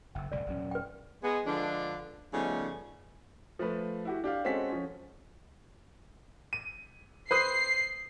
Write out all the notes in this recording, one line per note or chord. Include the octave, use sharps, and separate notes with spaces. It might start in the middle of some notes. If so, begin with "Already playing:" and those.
F#1 G5 E6
E1 C2 A2 D5
D#1 F#3 C#4
B4 G5
G#3 B3 G#4
D3 F3 G#3 D4 F4 B4
C#3 F3 G3 A3 B3 D#4
F3 A3 B4
E4 F#4 G4
D4 G4 F5
G#3 C4 C#4 F#4 A4 B6
F3 C#4
D#7
B4 C5 D#6 C7